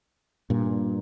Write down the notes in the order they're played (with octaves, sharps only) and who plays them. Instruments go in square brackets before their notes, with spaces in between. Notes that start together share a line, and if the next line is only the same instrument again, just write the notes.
[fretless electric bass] G2 A#2